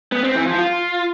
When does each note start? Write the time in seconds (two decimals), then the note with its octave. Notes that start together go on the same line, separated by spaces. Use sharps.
0.12 B3
0.24 C4
0.35 E3
0.47 F3
0.58 F4